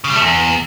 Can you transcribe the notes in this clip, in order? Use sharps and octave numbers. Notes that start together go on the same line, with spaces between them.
C#3
G3
A3
E2